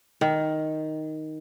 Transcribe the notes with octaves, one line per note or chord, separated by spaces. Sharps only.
D#3